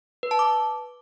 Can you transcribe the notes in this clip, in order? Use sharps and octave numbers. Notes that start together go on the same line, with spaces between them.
B4
A5
D6